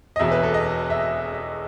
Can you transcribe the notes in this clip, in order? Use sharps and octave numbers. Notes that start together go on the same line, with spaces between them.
D#5
E1 E2 B2 E5
B4
A4
D#5
E5